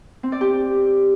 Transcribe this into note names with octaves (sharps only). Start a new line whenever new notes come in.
C4
D5
G4